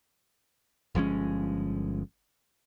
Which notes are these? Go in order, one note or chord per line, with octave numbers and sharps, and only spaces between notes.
G1 F3 G#3 C#4